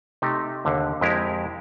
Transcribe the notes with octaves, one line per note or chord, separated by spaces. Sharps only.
C3 A3 D#4 G4
D#2 D3
F2 G#3 E4 G4 A#4